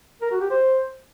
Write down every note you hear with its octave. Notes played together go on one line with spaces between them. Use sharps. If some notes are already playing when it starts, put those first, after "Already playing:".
A#4
F#4
G4
C5